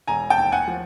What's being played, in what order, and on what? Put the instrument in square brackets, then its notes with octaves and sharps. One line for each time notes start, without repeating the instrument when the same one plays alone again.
[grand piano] E1 G#5 A#5
G5 A5
D#2
F#5 G#5
F3